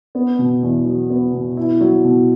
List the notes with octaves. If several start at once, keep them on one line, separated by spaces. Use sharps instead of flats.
B3
B2
E2
F#3
B3
B2
E4
F#3
B2